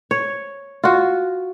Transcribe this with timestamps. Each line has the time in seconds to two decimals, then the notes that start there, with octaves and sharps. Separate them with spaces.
0.11 C#5
0.84 F4 F#4